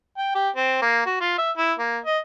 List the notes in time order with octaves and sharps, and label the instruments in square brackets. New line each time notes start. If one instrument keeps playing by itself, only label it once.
[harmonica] G5
G4
C4
A#3
F#4
F4
E5
E4
A#3
D#5